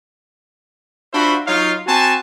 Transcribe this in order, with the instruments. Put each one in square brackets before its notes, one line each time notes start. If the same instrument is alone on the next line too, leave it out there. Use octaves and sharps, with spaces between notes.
[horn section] D4 F4 F#4 C5 E5 B5
F#3 D#4 F4 C#5 F5
C4 F#4 G#5 A5